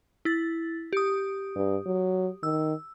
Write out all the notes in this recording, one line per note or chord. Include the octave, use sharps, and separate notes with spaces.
E4 A6
G4 D#6
G2
F#3
D#3 E6